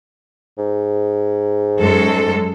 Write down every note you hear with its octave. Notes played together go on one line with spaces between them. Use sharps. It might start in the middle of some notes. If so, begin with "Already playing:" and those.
G#2
F#2 G#3 A4